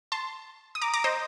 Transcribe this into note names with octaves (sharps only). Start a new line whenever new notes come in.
A5 C6
D#6
A#5 D6
A#5 D6
C5 D#5